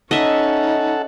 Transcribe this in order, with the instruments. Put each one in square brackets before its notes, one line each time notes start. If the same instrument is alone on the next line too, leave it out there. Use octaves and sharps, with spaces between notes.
[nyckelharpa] C#4 [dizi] D#4 [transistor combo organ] A4 F#5 [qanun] D#5 E5